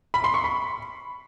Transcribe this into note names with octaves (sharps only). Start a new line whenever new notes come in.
B5
C6
C#6
B5